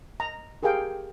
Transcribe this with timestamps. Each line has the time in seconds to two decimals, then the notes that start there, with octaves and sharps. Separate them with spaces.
0.20 A#5
0.63 G4 G#4 A#4 F5 G5